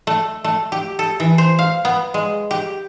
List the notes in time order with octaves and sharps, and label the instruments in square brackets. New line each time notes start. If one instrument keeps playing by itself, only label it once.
[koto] A3
A3
G4
A4
E3
C5
F5
B3
G#3
G4